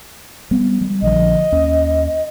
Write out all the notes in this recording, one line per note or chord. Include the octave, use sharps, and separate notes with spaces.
G3 B3 C4
G3 G#3
A#1 D3 F3 D#5
D#2 C#4